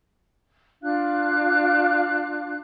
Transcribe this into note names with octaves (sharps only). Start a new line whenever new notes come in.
D4 F4 F5 F#6